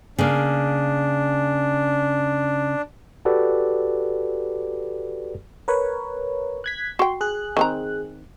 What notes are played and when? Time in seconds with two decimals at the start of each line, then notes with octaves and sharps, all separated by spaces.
0.18 C#3 A#3 D4
3.25 F#4 G4 A4 B4 D5
5.68 A#4 B4 C#5
6.64 F#6 G#6 B6
6.99 F#4 G5 C6
7.21 G#4 F#6
7.57 D#3 C4 A#5